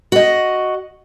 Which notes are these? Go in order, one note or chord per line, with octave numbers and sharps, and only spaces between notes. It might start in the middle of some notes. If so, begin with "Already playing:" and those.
F#4 D#5